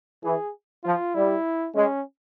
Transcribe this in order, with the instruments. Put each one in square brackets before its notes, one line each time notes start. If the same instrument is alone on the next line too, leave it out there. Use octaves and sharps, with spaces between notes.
[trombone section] E3 [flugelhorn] G#4
[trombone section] F3 [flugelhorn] F4
[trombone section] G3 [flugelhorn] E4
[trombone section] G#3 [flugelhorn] C#4